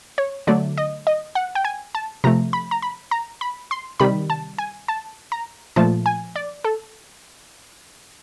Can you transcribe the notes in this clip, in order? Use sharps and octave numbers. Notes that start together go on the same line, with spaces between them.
C#5
D3 F#3 A3 D5
D#5
D#5
F#5
G5
G#5
A5
C3 F3 A3 A#5
B5
A#5
B5
A#5
B5
C6
C3 D#3 G3 B5
A5
G#5
A5
A#5
A#2 F3 A3 A5
G#5
D5
A4